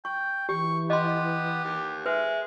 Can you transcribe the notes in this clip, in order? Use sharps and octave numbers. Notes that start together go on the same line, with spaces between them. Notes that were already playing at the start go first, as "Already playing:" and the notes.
G5 C#6
E3 G4 C#6
B3 G4 D#5 C6
D#2
G#3 B4 E5